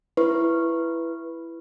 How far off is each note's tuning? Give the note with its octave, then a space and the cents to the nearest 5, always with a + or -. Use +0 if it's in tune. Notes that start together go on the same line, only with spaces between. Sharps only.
E4 +15 B4 +0 C#6 -10